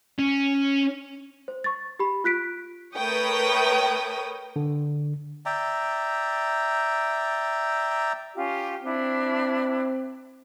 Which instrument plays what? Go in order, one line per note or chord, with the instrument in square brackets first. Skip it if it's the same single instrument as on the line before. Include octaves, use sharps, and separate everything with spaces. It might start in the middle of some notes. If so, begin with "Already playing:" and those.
[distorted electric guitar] C#4
[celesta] C5
C#6 A6
G4 B5
F4 F#6 B6 D7
[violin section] A3 A#4 B4 C#5 G5 D#6
[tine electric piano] D3
[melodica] D5 E5 G5 A#5
[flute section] C#4 F4 G4
[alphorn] C4 [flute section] D4 E4